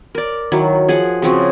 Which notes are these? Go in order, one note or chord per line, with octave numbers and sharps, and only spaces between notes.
A#4 D5
D#3 F#3 E4
F3 G#4 F#5
C#3 F3 C4 F#4